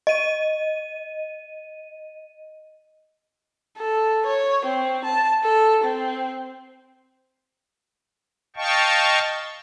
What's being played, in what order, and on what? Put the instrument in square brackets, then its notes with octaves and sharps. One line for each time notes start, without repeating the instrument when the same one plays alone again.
[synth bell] D#5 D#7
[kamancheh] A4
C#5
C4
A5
A4
C4
[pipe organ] D#5 F5 G5 A5 C#6